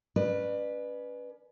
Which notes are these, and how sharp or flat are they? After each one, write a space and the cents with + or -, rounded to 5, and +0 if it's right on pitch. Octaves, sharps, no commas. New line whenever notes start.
C#4 +25 B4 +0 D5 +35